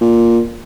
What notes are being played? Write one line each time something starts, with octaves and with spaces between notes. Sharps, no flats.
A#2